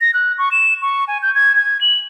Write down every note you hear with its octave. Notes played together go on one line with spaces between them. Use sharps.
A#6
F#6
C#6
E7
C#6
G#5
G6
G#6
G#6
F#7